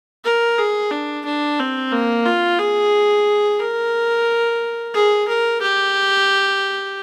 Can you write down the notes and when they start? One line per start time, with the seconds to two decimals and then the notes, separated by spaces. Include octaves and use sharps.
0.25 A#4
0.58 G#4
0.91 D4
1.25 D4
1.59 C4
1.91 A#3
2.26 F4
2.59 G#4
3.60 A#4
4.94 G#4
5.28 A#4
5.62 G4